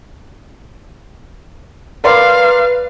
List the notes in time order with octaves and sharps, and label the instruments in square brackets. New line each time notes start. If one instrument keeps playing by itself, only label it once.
[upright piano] A#4 D5 C6 [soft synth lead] B4 [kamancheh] F5